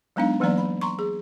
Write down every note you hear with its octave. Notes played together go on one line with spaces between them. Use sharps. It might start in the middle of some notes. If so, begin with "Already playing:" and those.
F#3 G#3 B3 D4 D#4 F5
E3 F#3 A#3 B3 D5 A#5
B5
A#5 C6 C#6
G#4